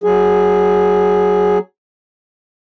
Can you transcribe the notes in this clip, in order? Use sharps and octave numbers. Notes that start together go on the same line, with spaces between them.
F#3 G#4